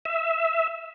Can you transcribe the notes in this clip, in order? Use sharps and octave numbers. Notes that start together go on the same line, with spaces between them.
E5